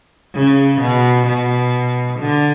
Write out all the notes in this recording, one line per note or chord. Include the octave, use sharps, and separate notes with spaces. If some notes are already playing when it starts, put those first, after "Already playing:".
C#3
B2
B2
D3